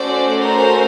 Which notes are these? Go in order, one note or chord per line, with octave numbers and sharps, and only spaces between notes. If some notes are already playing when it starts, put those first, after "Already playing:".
Already playing: A3 C#4 F#4 A4 C5 D5
A#4 C5